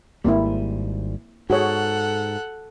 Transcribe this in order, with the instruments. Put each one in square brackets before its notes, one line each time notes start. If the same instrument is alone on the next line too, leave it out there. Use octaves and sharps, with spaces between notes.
[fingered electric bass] G#1 G#2 G3 [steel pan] A#3 C4 E4
[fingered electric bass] G#2 [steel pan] F#4 G#4 C#5 [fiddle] A4 F#5